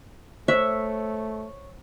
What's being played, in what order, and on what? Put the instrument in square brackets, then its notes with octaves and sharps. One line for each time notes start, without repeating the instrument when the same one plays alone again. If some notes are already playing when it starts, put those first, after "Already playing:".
[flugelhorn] A3 [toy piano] C5 [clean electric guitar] C#5 [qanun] E5